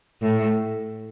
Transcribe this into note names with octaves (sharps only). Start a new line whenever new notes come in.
A2